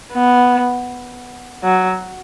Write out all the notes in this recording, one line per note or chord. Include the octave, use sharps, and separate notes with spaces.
B3
F#3